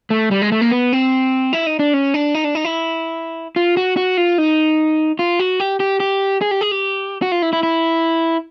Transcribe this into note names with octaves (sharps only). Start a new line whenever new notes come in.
A3
G3
G#3
A3
A#3
B3
C4
E4
D#4
D4
C#4
D4
D#4
D4
D#4
E4
F4
F#4
F#4
F4
D#4
F4
F#4
G4
G4
G4
G#4
G4
G#4
G4
F#4
F4
E4
E4
E4